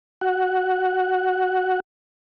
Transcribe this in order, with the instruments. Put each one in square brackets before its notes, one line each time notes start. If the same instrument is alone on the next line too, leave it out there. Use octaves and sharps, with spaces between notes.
[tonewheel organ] F#4 F#5